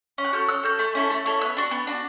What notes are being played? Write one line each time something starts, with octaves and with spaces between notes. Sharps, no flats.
C#4
F#6
F#4 A4 F6 G6
C#4 E6 F#6
F#4 A4 F6 G6
A3
C#4 E4 A4
A3
C#4 E4 A4
B3 E6 F#6
D4 F#4
B3
D4 F#4